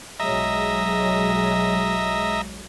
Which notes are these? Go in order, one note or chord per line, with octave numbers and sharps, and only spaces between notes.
B1 F#3 G#3 D#5 E5 A#5